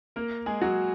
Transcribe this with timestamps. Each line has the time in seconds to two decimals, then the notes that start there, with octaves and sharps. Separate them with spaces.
0.16 A#3 A#4
0.46 G#3 G#4
0.62 F#3 F#4